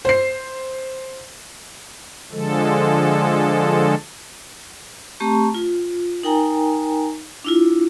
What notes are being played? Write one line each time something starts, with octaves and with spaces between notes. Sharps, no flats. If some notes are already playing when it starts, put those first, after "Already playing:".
C5 C7
D3 F3 G#3 A4
A3 C4 G4 A5 A#5 C#6
F4
D#4 A#4 G5 G#5 A#5
D4 E4 F4